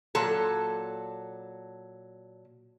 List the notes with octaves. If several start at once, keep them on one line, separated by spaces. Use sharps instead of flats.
A#2 F#3 A4